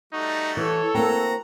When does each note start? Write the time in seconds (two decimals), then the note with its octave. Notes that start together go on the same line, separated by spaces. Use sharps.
0.13 G3 A3 D#4 F#4
0.57 E3 A4 C#5
0.95 A#3 C4 F#4 A#5